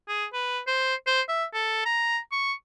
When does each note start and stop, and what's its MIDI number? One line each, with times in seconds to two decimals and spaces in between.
0.08 0.25 68
0.33 0.60 71
0.67 0.95 72
1.07 1.21 72
1.29 1.45 76
1.54 1.84 69
1.86 2.19 82
2.32 2.53 85